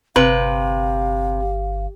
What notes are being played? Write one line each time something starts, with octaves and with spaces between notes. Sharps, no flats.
G1 C3 B4 F5